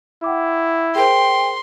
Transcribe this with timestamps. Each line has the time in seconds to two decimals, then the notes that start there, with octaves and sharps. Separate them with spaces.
0.24 E4 F#5 G5 D6
0.96 G#4 A#4 C5 G5 C6